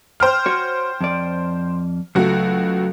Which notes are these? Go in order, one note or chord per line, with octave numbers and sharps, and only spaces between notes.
C5 G5 F6
F#4 C#5
F2 D5
C#2 F#3 A3 F#4